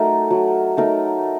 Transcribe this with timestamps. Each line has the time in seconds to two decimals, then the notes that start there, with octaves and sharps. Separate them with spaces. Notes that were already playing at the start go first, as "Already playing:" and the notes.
Already playing: F#3 A3 D#4 A#4
0.31 F#3
0.77 A3 D#4 A#4